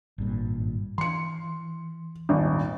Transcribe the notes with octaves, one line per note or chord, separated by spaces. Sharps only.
G#1 G2 A#2
E3 C6 C#7
D#1 G#1